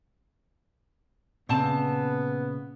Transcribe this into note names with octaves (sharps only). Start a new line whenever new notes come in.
A#2 C#3 B3 C4 A5